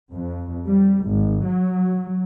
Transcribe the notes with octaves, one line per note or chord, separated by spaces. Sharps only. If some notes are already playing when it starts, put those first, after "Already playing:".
F2
G3
G#1
F#3